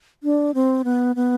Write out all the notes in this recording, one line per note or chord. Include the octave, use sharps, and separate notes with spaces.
D4
C4
B3
B3